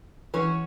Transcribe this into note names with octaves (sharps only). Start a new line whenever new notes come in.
E3 G#3 C#4 F#4 C#5